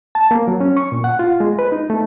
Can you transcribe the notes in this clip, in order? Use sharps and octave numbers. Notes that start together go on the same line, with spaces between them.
A5
A#3
F#3
C#4
C#6
A#2
F#5
F4
G#3
B4
D#4
A3